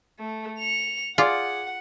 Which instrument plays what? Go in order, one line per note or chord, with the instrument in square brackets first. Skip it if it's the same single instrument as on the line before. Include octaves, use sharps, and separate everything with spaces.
[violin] A3
C#7 F7
[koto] F4 [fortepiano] G#4 D5 D6 [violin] F#5